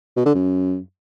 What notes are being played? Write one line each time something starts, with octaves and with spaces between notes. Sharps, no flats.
B2
D3
F#2